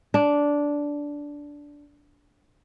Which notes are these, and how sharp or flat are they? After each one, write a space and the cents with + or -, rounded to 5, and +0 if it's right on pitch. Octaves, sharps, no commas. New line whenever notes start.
D4 -10